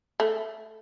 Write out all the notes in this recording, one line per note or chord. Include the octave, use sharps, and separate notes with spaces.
A3